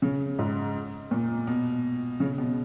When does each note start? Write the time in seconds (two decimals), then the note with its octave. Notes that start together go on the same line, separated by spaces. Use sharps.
0.02 C#3
0.39 G#2
1.11 A#2
1.47 B2
2.20 C#3
2.38 B2